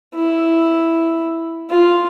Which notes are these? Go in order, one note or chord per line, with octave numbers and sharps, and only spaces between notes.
E4
F4